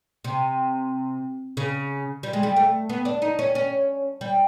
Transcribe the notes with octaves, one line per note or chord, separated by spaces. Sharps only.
C3
C#3
G3
G#3
G3
A3
B3
D4
D#4
C#4
C#4
G3